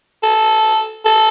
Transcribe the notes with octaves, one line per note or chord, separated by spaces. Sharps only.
A4
A4